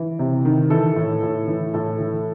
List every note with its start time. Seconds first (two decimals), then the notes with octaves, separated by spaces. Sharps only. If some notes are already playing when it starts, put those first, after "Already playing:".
Already playing: E3
0.19 C3
0.45 D#3
0.70 E3 A4
0.96 A2
1.23 A2
1.48 E3
1.74 A2 A4
2.00 E3